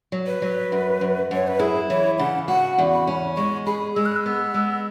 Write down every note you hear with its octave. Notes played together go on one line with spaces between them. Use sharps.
F#3
B4
F#3
F#2
F#2
F#2 C#5
B4
E4 G#4
E3 C#5
C#3 F#5
F#4 F#5
E2
B5
C#4
G#3 C#6
G#4 B5
G#3 E6
F#6
E6
B3
G#3